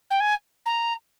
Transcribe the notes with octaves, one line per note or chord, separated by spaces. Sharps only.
G5
G#5
A#5